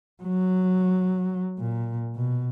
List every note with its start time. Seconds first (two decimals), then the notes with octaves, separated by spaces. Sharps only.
0.23 F#3
1.59 A#2
2.16 B2